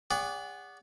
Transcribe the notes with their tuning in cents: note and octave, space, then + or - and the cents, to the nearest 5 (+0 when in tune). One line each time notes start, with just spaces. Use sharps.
G#4 -45 D5 -35 F#5 +0